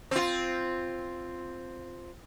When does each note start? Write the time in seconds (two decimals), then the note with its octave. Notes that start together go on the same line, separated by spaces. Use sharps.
0.11 C4 F4